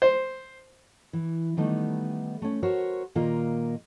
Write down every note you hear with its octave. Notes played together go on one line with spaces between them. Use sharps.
C5
E3
D#3 G3 A3 B3 D#4
A3 C#4
F#4 A#4 C5 C#5
A#2 D#3 A#3 F4 A#4 D#5